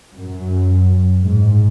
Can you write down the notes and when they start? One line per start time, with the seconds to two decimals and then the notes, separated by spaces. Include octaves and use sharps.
0.15 F#2
1.24 G#2